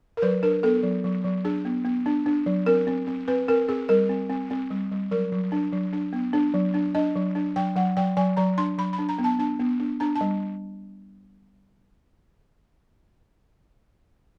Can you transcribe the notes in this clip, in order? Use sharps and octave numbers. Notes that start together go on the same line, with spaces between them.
A#4
F#3 B4
D4 A#4
B3 A4
F#3
F#3
F#3
D4 G#4
B3
B3
D4
D4
F#3
C4 A#4
C4
C4
C4 B4
C4 A#4
C4 G#4
G3 A#4
C4
C4
C4
G3
G3
F#3 A#4
F#3
D4
F#3
D4
B3
D4
F#3
D4
D4 D#5
F#3
D4
F#3 G5
F#3 F#5
F#3 G5
F#3 G#5
F#3 A#5
D4 C6
F#3 B5
B5
D4
A#5
B3
A5
D4 A5
B3
D4
D4 A#5
A5
G3